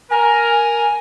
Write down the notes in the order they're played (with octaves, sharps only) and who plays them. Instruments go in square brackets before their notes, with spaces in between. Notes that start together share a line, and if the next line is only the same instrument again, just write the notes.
[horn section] A#4 [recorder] G#5